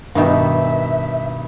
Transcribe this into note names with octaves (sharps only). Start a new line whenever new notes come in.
G2 B2 D#3 D#4 E5